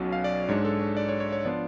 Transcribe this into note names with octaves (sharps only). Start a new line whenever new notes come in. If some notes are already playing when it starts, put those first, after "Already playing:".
Already playing: B1 B2 F#3 C#4
F5
D5
G#2 G#3 D4 C#5
A4
C#5
D5
C#5
C#5
C#5
F3 B3 D4 F4 D5